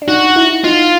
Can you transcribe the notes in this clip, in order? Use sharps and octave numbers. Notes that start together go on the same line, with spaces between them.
D4
D#4 F#4
E4
D#4 F4